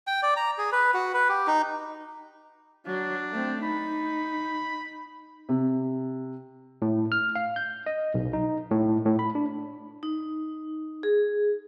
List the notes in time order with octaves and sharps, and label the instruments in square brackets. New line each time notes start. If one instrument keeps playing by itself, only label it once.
[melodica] G5
D5
A#5
G#4
B4
F#4
B4
G4
D#4
[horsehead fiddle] F#3 [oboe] D4
[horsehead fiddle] A3 C4
[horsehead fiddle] D#4 [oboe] B5
[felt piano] C3
[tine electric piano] A2
F6
F5
G6
D#5
B1
D#4
A2
A2
B5
D4
[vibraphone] D#4
G#4